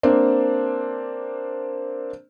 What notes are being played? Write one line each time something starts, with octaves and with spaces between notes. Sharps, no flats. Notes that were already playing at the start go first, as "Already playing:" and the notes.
A#3 C4 D4